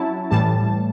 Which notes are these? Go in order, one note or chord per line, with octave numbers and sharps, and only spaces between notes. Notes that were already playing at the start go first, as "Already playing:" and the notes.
Already playing: F#3 C#4 E4 A5
A2 E3 G3 A5